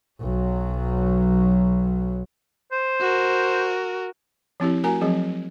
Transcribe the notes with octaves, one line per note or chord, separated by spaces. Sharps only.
B1 F#3
C5
F#4 A#4
F3 C4 E4 G4
A3 F#4 A#4 G#5 A#5
F3 F#3 C4 G#4